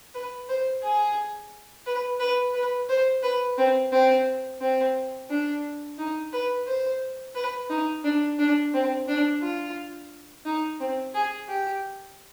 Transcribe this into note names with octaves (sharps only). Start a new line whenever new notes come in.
B4
C5
G#4
B4
B4
B4
C5
B4
C4
C4
C4
D4
D#4
B4
C5
B4
D#4
D4
D4
C4
D4
F4
D#4
C4
G#4
G4